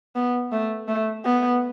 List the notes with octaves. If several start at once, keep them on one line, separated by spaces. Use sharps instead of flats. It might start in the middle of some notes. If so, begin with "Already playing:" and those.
B3
A3
A3
B3